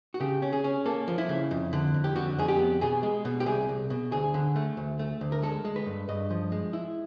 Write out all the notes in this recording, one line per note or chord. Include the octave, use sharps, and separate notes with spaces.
F#4
C#3 G4
C#4
G#4
C#4
A#3 A4
F3
E4
C#3
F2
D3
F2
G4
D3 F#4
F2 G#4
G4
B3
B2 G#4
G#3
B2
G4
C2 G#4
C2
B2
D2 G#4
D3
A3
D2
A3
D2
A#4
G#3 A4
G#3
B4
G2
G2 D#5
F3
G#3
E4